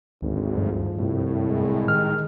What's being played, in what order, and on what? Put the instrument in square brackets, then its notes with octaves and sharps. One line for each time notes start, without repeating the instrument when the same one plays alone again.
[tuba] G#1 [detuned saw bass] D2
[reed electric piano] G2 [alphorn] F3
[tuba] C2 [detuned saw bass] A2
[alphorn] G#3
[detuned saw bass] D#3 [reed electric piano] F6